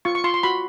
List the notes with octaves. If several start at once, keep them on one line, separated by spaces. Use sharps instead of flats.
F4 C#6
C#6
F4 C6
C6
F#4 B5